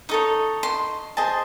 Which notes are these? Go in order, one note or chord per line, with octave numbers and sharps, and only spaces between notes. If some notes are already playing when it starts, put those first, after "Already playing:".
D#4 A4 C#5 D#6
C6
G#4 C5 D#5 A5